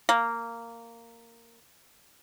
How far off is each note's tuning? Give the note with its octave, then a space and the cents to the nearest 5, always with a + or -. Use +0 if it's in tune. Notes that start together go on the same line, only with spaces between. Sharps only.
A#3 -10